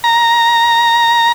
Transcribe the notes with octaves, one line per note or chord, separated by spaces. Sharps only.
A#5